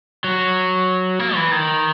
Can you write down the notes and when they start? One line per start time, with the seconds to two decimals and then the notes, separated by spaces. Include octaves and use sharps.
0.24 F#3
1.19 A#3
1.35 E3
1.51 D#3